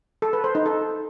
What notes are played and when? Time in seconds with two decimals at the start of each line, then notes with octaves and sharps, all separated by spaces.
0.22 A4
0.33 B4
0.44 C5
0.55 D#4
0.66 A4